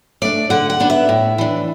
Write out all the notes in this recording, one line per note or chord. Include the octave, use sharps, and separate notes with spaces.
A3 D4 D5
D3 F#5
F#5
B3 D4
E5
A2
E3 D4